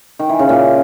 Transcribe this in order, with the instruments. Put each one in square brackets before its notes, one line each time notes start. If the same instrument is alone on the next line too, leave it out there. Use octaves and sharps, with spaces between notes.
[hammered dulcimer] D#3
E3
C#3
A#2